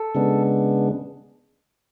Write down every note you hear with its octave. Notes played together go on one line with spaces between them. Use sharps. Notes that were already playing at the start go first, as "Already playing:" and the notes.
Already playing: A4
C#3 G#3 B3 D4